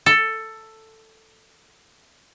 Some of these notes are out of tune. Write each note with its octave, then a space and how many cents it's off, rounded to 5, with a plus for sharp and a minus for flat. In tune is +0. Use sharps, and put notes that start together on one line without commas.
A4 +10